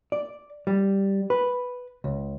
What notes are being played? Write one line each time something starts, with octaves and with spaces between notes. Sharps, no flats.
D5
G3
B4
C#2